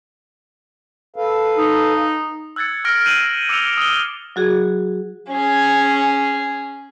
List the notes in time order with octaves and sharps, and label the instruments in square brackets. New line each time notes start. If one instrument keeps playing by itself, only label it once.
[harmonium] A4 B4 F5
[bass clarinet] D#4
[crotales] E6 F#6 G#6 A6 C#7
E6 F6 A#6 D7
G6 A#6 C7 D#7 E7 F#7
A#6
D6 E6 C#7 D7 F7 G7
D#6 G7
[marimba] F#3 F#4 G#4
[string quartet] C#4 G#4